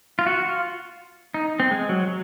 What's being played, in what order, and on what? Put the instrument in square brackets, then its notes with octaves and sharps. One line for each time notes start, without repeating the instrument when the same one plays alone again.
[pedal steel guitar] F4
F#4
F4
D#4
C4
G#3
F#3
F#3